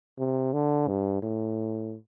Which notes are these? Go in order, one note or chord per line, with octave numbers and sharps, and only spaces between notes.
C3
D3
G2
A2